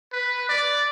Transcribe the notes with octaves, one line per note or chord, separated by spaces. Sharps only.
B4
D5